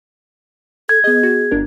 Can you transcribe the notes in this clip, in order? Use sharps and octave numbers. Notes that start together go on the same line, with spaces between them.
A4 G#6
B3 G#4 D#5
F#4
G1 D4 A#4